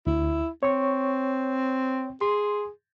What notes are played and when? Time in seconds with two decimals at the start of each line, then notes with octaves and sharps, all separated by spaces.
0.07 D2 E4
0.63 C4 C#5 C#6
2.21 G#4 C6